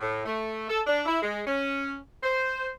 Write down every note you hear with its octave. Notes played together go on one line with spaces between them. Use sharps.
A2
A3
A4
D4
E4
G#3
C#4
C5